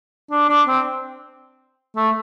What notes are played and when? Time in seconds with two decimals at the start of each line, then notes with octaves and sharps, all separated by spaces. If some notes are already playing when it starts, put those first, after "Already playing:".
0.31 D4
0.49 D4
0.67 C4
1.96 A3